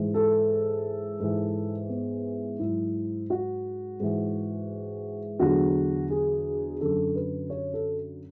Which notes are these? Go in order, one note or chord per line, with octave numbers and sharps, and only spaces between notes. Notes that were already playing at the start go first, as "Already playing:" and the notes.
Already playing: G#2 E3
A4
G#2 E3
B3
G#2 F#3 E4
F#4
G#2 E3
E2 D3 F#3 F#4
G#4
F#2 D3 F#3 A4
B4
C#5
A4